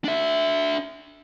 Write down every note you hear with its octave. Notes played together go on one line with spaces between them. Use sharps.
D4 E5